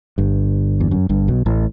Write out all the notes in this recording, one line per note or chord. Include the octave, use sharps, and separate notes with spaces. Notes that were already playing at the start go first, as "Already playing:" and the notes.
G1 G2
E2
F#2
G1 G2
B1 B2
A1 A2